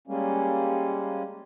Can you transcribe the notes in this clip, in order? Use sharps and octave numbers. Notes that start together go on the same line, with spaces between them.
G3 G#3 A#3 C#4